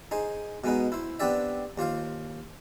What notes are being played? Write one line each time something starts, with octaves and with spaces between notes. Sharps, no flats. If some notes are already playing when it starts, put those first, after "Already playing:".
D#4 G#4 C5
B2 G#3 B3 D#4
E4 C5
B3 C4 D4 G4 D5 E5
D#2 F4 C5 F5